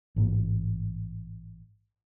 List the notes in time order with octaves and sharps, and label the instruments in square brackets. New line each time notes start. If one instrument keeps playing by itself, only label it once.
[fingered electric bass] A1 G#2 A#3